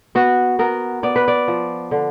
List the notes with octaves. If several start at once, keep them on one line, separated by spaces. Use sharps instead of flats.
B3 F#4
B3 A#4
B3 D5
B4
D5
F3
D3